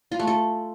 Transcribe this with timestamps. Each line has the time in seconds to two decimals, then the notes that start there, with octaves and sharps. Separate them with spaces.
0.12 F4
0.19 A3
0.27 A4